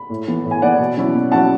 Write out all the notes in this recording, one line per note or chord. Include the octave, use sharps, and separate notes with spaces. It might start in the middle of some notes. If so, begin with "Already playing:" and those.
Already playing: B5
A2
E3 B3
A2
G#5
E3 B3 D5 F#5
B2
F#3 C#4 E4
B2
F#3 C#4 E4 F#5 A5